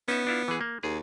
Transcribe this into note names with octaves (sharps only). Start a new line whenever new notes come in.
B3 C#4 D#4 E5
D4 E4 F4
E3 G#4
A#3
D#2 G#4